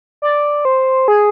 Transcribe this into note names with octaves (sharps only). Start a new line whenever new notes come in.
D5
C5
G#4